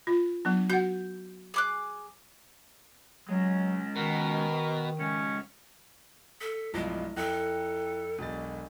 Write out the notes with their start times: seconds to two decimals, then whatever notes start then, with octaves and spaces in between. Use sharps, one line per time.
0.07 F4
0.45 F#3 B3 D4
0.69 F#4 F#5 G6
1.54 G#4 D6 F#6
3.29 F#3 G#3 C#4
3.96 B2 D#3 A#4
4.99 G#2 C#3 C#4
6.41 A4 B6
6.74 B1 G2 F3 G#3 E4
7.17 F2 E4 A4 G5 F#6
8.19 E1 B1 D4 A6